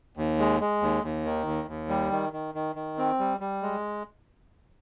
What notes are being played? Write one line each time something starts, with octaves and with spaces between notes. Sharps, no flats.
D#2
G#3
G#3
D#2
D#2
D#3
D#2
D#2
G3
D#3
D#3
D#3
D#3
C4
G3
G3
G#3